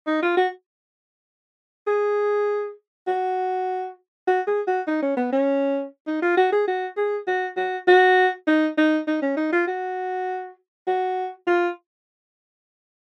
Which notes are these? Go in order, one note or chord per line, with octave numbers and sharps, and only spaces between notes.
D#4
F4
F#4
G#4
F#4
F#4
G#4
F#4
D#4
C#4
B3
C#4
D#4
F4
F#4
G#4
F#4
G#4
F#4
F#4
F#4
D#4
D#4
D#4
C#4
D#4
F4
F#4
F#4
F4